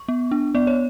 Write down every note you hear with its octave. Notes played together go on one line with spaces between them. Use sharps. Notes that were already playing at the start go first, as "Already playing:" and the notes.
Already playing: C#6
B3
D4
B3 D5
C#5